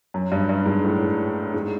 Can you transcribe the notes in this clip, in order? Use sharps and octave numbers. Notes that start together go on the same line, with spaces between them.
F#2
G2
G2
G#2
A2
G#2